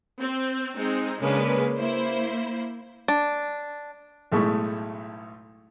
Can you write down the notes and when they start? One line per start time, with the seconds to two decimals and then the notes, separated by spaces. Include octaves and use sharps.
0.22 C4
0.77 G#3 C4 D#4
1.19 C#3 G#3 A#3 C#4 D4 B4
1.77 A#3 E4 C5
3.08 D4
4.32 B1 A2 G#3 A3 E4 C#6